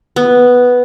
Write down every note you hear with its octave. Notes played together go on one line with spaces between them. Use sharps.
B3